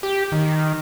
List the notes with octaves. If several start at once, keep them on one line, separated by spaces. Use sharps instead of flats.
G4
D#3